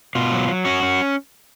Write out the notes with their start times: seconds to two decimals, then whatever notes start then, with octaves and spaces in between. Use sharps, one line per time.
0.15 B2 F4
0.32 F#3
0.48 F#3
0.65 C#4 F#4
0.83 C#4